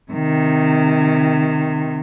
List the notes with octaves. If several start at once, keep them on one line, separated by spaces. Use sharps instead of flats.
C3 D#3